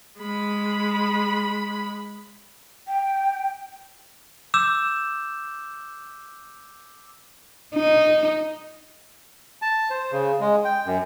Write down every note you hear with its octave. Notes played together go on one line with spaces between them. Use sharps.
G#3 B5
G5
D6 E6 G6 E7
D#4
A5
C5
C#3
G#3
G5
F#2